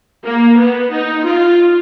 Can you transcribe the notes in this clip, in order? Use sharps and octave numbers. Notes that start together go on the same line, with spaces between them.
A#3
B3
D#4
F4